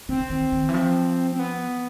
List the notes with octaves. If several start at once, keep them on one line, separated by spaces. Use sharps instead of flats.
D3 C4
D#3
D#3
E3
F3
C4
B3